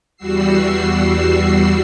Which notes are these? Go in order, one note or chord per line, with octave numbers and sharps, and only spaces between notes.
E2 G3 F#4 E6 C7